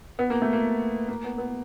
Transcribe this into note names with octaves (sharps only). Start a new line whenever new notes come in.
B3
A#3
A3
A#3
A#3
B3
B3